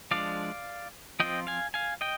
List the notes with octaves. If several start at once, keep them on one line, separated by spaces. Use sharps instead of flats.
F3 G#3 D4 D5 F5
F3 C4 F4 D#5 G5
F5 G#5
F5 G#5
D#5 G5